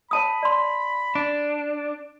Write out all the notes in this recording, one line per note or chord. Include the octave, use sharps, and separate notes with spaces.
C#5 A5 B5 D#6
D5 C6
D4